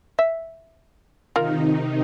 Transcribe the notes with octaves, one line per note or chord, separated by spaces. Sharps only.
E5
C3 D#3 D#4 F4 A#4